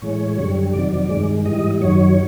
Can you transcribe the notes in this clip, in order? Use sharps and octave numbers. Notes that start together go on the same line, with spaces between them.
A2 E3 G#3 C#5
F#2 D3 G3
F2 C3 D#3 F#3 D5
G2 D#3 G#3
G#2 E3 G3 D#5
F#2 D#3 F#3 C#5